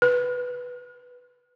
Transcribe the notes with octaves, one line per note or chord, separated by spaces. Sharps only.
B4